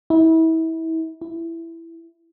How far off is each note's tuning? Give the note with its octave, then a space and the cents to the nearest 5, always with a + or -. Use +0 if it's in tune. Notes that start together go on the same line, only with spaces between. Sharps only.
E4 -30
E4 +10